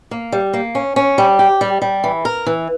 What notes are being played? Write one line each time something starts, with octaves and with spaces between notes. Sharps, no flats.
A#3
G3
A#3
C#4
C#4
G3
G4
G3
G3
E3
A#4
E3